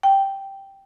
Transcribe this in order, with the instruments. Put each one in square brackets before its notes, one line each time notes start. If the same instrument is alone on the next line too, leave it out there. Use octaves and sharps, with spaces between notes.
[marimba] G5